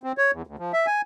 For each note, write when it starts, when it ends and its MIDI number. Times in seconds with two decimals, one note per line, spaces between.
0.04 0.12 60
0.18 0.31 73
0.33 0.42 40
0.47 0.56 38
0.59 0.72 53
0.73 0.86 76
0.87 1.02 80